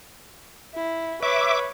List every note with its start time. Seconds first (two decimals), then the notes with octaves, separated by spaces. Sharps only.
0.75 E4
1.23 B4 C#5 E5 D6